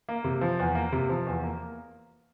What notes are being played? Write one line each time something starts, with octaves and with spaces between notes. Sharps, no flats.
A#3
C3
F3
E2
A#3
C3
F3
E2
A#3